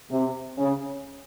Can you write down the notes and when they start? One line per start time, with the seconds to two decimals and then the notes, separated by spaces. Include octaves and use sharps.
0.11 C3
0.58 C#3